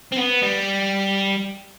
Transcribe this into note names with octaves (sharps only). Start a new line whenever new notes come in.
C4
B3
G3